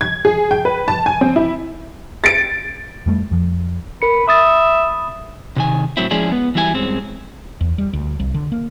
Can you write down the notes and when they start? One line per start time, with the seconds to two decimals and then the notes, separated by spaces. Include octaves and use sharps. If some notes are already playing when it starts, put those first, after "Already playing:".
0.01 G#6
0.25 G#4
0.51 G5
0.65 B4
0.88 A5
1.06 G#5
1.21 C4
1.36 E4
2.24 A6 C#7 D7
3.06 F2 G3 A3
3.31 F2 F3
4.02 A#4 B4 C#7
4.28 E5 B5 D#6 A6
5.56 C3 D#3 G#5
5.97 A2 F#3 C4 E4
6.11 F3 G#3 C#4 E4 G#4 D5
6.32 B3 B4
6.55 E3 F#3 G3 E4 G#4 G#5
6.74 G2 G#3 C4 C#4
7.61 E2
7.78 G3
7.93 D2
8.20 C2
8.34 D3
8.52 A#3